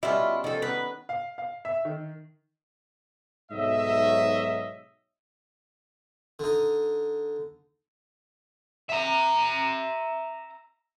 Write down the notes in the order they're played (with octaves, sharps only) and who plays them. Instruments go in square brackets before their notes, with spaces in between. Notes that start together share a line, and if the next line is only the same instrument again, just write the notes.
[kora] B2 G3 C#4 [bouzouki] E4 F4
[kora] D#3 [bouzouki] F3 A4
[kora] B3 A#4 [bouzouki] B4
[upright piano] F5
F5
E5
D#3
[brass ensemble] B1 G#2 F#3 C#5 D#5 E5
[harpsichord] D3 D#4
[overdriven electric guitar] E5 A#5